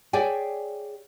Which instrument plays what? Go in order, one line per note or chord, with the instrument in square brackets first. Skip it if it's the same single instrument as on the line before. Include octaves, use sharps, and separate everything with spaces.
[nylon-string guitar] G#4 C#5 D5 E5 G5 G#5